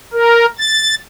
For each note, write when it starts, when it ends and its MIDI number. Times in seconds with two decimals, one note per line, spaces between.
0.13 0.46 70
0.59 0.95 93